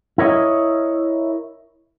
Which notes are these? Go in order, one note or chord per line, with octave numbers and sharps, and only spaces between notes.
E4 A#4 C#5 D#5